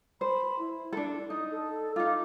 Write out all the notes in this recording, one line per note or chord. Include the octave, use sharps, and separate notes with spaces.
C5 B5
E4
D4 A4
D#4 D#6
A4
D#4 F4 D6